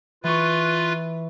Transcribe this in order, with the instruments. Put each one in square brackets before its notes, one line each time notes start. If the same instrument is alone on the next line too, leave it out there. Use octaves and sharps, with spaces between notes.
[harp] E3 C#6 [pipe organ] F4 B4